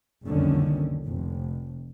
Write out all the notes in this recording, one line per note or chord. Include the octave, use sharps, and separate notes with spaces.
F#1 C2 F2 D3 D#3 C#4
F1